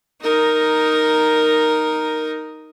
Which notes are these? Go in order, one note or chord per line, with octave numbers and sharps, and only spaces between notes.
D#4 A#4